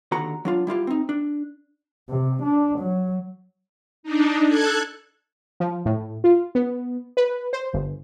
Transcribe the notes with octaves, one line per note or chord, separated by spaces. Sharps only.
D#2 D3 F#4 A#5
F#3 D4 F4
G3 E4 F4 G4
C4 D#4
D4
C3
D4
F#3
D4 D#4
A4 F#6 G#6
F3
A2
F4
B3
B4
C5
G1